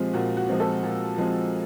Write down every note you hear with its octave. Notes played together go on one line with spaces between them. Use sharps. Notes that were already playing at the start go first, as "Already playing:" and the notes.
Already playing: A#2 F3 G#3 C4 G4
A#2 F#4
F#4
F3 G#3 C4
A4
A#2
F3 G#3 C4